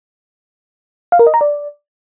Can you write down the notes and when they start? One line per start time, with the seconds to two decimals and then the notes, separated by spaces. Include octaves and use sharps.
1.12 F5
1.19 A#4
1.27 D#5
1.34 A#5
1.41 D5